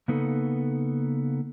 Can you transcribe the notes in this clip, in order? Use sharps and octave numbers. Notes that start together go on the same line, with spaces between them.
C#3 A#3 B3 D#4 A4